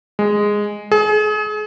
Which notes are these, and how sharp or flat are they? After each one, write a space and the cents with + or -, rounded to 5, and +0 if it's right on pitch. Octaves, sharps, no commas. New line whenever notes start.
G#3 -5
G#4 +35